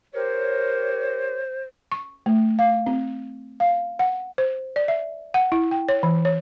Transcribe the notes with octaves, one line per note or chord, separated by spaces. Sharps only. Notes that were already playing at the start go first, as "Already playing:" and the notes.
G4 A#4 C5 C#5
C#6
A3
F5
C4
F5
F#5
C5
D5
E5
F#5
E4
G5
C#5
E3
C#5